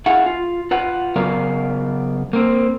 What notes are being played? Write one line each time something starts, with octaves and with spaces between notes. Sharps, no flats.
E4 G#4 F5 F#5
F4
F4 B4 F#5
C#3 F#3 B3 A#4 D5 F5
A#3 C4